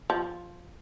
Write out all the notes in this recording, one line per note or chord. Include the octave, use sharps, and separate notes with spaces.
F3